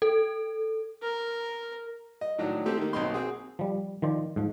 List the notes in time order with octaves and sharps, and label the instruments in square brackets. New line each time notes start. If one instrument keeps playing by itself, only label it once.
[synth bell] A4
[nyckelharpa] A#4
[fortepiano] D#5
A2 D#3 F#3 D4
A3 C4 G4 A4
D#3 A#3
B1 A#3 C4 D#4 C6
C4 F#4 G#4
[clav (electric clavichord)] F3 G3
D#3 F3 C5 D5
G#2 F3